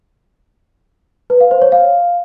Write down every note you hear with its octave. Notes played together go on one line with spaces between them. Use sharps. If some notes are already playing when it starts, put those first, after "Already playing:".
B4
F5
C5
C#5
F5